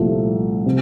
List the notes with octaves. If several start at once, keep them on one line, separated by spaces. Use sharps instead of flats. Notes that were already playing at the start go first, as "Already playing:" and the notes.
Already playing: C2 A#2 F3 A3
C3